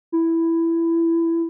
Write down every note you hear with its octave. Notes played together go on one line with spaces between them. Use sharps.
E4